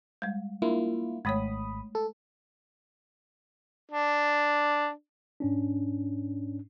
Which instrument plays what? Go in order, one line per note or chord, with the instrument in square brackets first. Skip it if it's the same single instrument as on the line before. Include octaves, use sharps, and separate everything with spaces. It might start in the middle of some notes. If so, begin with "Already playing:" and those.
[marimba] G3 G#3
[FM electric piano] A#3 E4 F4 [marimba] D4
[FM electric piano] G#1 B5 D#6 [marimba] G#3 A3 C#5
[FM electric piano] A4
[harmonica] D4
[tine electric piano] G#2 C#4 D4